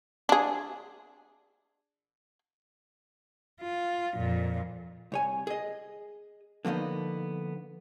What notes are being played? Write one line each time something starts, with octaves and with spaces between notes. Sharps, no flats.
D4 G#4
F4
F2 A#2
C2 C#5 G#5
G#4 D#5
D3 F3 A#3 B3 D#4